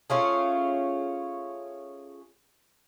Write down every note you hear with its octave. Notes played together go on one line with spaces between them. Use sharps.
A3 C#4 F4 G#4